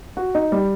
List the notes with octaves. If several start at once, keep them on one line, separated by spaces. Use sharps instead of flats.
F#4
D#4
G3